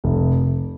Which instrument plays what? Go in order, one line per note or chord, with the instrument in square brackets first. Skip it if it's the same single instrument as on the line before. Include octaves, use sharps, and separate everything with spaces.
[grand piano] F1